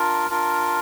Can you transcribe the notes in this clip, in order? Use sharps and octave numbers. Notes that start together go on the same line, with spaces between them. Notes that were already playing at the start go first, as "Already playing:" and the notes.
Already playing: D4 F4 A#4
D4 F4 A#4